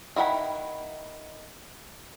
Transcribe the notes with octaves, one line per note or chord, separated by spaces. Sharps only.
D#3 E4 F#5 G5 B5